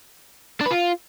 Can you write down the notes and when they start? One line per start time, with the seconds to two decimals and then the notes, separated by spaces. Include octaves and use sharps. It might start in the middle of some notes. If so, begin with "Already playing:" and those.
0.61 D4
0.66 B4
0.71 F4